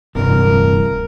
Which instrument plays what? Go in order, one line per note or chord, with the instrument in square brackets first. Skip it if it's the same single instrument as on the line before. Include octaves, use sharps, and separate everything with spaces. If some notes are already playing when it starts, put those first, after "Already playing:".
[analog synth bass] D1 [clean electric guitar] G2 C3 E3 [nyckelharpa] A#4